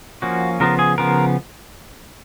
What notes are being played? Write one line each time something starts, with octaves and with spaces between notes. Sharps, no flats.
F3 A#3 C#4 F#4
C#3 F3 B3 A#4
G#4
C#3 F3 B3 A#4